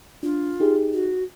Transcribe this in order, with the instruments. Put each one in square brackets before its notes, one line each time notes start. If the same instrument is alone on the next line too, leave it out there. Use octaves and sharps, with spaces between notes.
[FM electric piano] D4 [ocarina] F4
[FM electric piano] D#4 G4 G#4
[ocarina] F#4